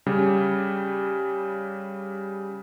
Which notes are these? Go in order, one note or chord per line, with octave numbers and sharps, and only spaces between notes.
C#3 G3